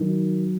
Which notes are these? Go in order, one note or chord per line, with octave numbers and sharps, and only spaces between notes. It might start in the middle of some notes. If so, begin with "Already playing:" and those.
Already playing: D#3 F#3